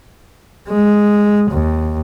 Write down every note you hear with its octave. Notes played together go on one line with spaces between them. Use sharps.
G#3
D#2